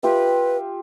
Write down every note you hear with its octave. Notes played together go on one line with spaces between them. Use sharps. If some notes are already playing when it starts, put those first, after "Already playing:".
F4 G4 B4 E5